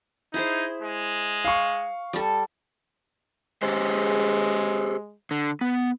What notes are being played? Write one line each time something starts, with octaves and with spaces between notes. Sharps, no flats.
D#4 E4 G#4 C5
G#3
F5 C#6
G3 A4
G#3 G4 G#4 C5
D3
B3